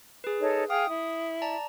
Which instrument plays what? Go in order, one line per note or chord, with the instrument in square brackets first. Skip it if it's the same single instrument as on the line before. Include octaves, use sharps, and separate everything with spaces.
[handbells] G#4 B4
[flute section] D#4 A4 C#5
[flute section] G#4 F5 G5 [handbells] D#6
[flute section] E4
[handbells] D5 A5 A#5